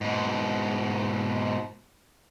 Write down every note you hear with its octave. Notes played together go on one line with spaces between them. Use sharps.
G#2 B2